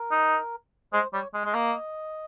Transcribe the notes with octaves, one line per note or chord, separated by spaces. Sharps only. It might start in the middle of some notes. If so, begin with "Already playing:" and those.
Already playing: A#4
D#4
G#3 C5
G3 C#5
G#3
G#3
A#3 D#5